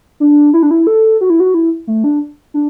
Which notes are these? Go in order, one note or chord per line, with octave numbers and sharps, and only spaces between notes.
D4
E4
D4
E4
A4
F#4
E4
F#4
E4
A3
D4
D4